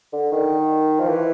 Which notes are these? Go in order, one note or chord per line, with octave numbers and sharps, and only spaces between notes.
D3
D#3
F3
E3